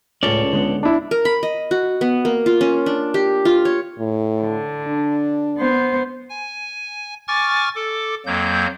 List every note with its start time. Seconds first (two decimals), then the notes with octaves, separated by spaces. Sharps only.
0.23 C#2 A2 C#4 A4 C#5 D5
0.53 D3 G#3 B3
0.83 D4 E4
1.11 A#4
1.25 B5
1.43 D#5
1.71 F#4
2.01 B3
2.25 A#3
2.46 F4
2.61 C#4
2.86 D4
3.14 G4
3.45 F4
3.65 C#5
3.99 A2
4.41 D3
4.87 D4
5.58 B3 C5
6.30 G#5
7.28 G#5 C#6 D6 F6 A6
7.75 A4 D6
8.26 F2 F#3 A#3 G6